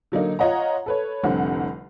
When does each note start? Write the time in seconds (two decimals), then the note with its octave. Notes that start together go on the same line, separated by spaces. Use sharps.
0.12 D3 F#3 A#3 D#4
0.39 F4 C#5 D#5 F#5 A#5
0.86 A4 B4 C#5
1.23 F1 C2 D3 C4 F#5